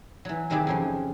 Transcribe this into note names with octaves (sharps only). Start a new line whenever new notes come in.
E3 F#3
C3 D#3 F#3 E4 G4 G#4
F2 C#3 F3